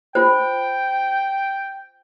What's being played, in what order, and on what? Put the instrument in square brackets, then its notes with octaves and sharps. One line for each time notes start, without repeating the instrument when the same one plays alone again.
[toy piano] F4 C5 [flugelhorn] G5